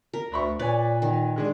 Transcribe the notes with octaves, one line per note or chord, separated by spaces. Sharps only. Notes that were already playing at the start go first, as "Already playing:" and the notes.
A#4
D2 D4 B5 C#6
A#2 B4 C#5 D5 G#5
D#3
D3 G#3 D4